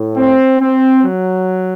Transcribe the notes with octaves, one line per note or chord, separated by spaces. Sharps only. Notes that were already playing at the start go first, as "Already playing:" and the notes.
Already playing: A2
C4
C4
F#3